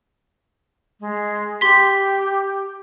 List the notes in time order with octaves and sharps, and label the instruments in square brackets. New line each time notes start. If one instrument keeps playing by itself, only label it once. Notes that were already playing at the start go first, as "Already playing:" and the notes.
[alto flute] G#3
[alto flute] G4 [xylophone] C6 B6